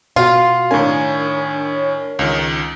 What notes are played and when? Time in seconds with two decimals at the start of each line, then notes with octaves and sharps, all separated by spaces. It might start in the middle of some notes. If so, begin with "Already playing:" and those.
0.16 B2 F4 F#4 F5
0.71 A2 D#3 D4 A#4 C#5 G#5
2.19 C#2 D#3